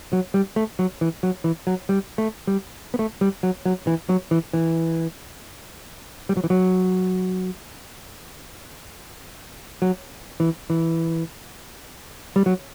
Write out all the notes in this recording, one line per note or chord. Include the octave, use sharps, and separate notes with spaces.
F#3
G3
A3
F#3
E3
F#3
E3
F#3
G3
A3
G3
B3
A3
G3
F#3
F#3
E3
F#3
E3
E3
G3
F#3
E3
F#3
F#3
E3
E3
G3
F#3